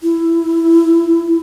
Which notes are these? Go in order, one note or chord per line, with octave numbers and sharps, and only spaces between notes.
E4